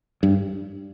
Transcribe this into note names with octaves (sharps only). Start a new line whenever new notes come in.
G2